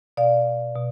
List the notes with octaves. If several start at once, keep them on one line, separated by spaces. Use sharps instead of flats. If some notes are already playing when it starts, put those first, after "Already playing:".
B2 D5 F5
B2